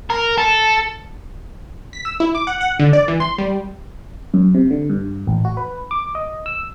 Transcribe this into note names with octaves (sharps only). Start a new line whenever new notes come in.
A#4
A4
B6
E6
E4
D6
F#5
F#5
D3
D5
E3
C6
G3
F#2
C3
D3
G2
A1
F#4
B4
D6
D#5
E6